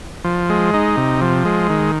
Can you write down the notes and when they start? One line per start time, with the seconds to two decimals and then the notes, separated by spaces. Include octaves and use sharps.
0.24 F3
0.50 G#3
0.74 D#4
0.97 C3
1.21 F3
1.45 G#3
1.70 D#3